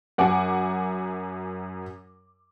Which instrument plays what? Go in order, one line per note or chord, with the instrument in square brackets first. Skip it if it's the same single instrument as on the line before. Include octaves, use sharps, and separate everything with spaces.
[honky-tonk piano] F#2 F#5 G#5 D6